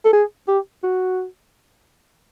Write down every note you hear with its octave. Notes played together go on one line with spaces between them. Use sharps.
A4
G#4
G4
F#4